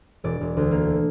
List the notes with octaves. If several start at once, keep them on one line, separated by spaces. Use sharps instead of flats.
E1 D5
E1
D2
A#3